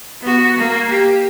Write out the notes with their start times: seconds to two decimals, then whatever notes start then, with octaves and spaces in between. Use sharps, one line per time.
0.22 B3 F#4
0.58 A#3
0.89 G4